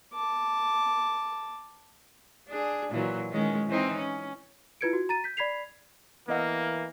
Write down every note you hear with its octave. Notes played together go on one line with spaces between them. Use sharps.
A5 D6
D4 G#4
A#2 E3 F#3
D#3 G#3 C#4
E3 C4 D#4
C#4
E4 F4 B4 G#6 C#7 D7
F#4
A#5 A6 D#7
G6 B6
D5 B5 G#6 B6 C7 F7
E3 A#3 B3 D#5 F#5